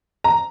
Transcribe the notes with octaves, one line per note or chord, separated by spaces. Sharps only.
A#5